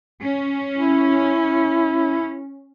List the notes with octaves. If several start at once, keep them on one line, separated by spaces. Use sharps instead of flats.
C#4
E4